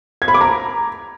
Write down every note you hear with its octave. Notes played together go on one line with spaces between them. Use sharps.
G#6
B5
D6
A#5